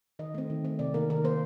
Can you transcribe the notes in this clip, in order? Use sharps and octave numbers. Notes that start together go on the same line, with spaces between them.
D#3 D#5
A3 C4
D#3
A3 C4
C3 D5
D#3 A#3 A#4
D#3 A#4
A#3 C5